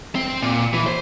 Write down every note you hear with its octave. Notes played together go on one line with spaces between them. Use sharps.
C4
A#2
E3
C5